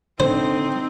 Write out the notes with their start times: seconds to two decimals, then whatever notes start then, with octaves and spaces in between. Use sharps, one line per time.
0.20 D3 C4 D#4 C5